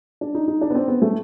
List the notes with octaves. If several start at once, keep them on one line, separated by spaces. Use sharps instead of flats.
D4
D#4
D#4
D4
B3
C4
B3
A3